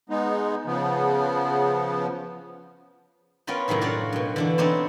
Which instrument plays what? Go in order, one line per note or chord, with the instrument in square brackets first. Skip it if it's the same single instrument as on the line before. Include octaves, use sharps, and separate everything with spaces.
[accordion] G#3 B3 D#4
C#3 F3 B3
[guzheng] B3 C#4 F4 A#4 G5
F#2 A2 C3 D#3 D#4
D4 F4 F#4 C#5 D5
F#2 B2
D3 E3 D4
B3 C4 D4 D#4 C5 C#5